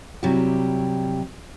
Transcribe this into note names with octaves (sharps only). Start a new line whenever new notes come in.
C3 F#3 G3 E4 G4